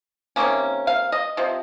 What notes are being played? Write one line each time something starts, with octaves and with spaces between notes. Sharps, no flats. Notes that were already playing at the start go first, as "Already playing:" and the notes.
C3 D#3 A#3 C#4
F5
D#5
C3 F3